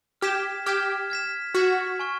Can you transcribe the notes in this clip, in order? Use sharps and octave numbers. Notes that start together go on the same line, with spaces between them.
G4 F6 G#6 B6 E7
G4 F6 G#6 B6 E7
F6 G#6 B6 E7
F#4 F6 G#6 B6 E7
G#5 C#6 F6 G#6